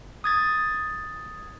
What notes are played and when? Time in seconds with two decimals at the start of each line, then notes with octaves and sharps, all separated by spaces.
0.24 D#6 G#6 A6